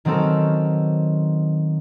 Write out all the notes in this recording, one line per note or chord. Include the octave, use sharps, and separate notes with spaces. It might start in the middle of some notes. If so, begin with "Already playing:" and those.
D#3 F#3 C4 C#4 A4 A#4